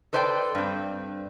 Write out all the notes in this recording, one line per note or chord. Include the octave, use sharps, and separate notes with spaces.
A4 B4 C5 D5 F#5 G5
G2 C4